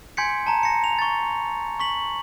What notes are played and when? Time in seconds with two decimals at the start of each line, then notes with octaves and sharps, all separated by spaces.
0.17 G#5 C6 G6 G#6 B6 C#7
0.47 A5 A#5
0.63 A#6 C#7
0.84 F7
0.99 C#6 A6
1.80 C#6 B6 F#7